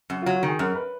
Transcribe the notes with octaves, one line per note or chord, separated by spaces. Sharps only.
F#2
F#3 F4
F#4
D#3
G#4
F#2 A#4
B4